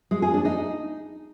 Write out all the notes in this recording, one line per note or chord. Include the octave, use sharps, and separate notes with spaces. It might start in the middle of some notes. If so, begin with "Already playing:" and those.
G#3
G#4
D4
D#4